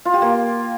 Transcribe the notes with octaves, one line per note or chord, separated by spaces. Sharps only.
F4
G4
A#3